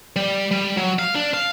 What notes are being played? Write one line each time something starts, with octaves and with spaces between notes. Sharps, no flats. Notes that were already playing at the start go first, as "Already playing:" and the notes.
G3
G3
F#3
F5
D4
F5